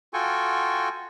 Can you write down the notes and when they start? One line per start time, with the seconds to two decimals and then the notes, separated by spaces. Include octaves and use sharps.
0.14 F4 F#4 A4 G5 G#5 C#6